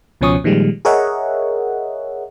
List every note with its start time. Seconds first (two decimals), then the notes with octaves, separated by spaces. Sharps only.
0.21 C#2 B2 F3 C#4 C#6 D#6
0.44 A#2 D#3 F3 G3 G#3
0.85 G#4 A#4 C#5 D#5 E5 F#5